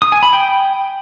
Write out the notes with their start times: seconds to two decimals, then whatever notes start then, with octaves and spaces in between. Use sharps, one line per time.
0.02 D#6
0.12 G#5
0.23 B5
0.33 G5